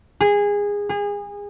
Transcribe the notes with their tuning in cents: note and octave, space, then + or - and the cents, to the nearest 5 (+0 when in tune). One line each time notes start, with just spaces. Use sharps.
G#4 -20
G#4 -30